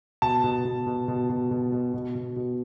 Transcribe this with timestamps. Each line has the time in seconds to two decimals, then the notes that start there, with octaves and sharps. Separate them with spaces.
0.22 B2 A5
0.44 B2
0.65 B2
0.87 B2
1.08 B2
1.30 B2
1.51 B2
1.72 B2
1.94 B2
2.15 B2
2.36 B2